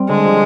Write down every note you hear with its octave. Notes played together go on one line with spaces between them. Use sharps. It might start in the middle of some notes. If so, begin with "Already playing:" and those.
Already playing: G3 C4
D3 G#3
F3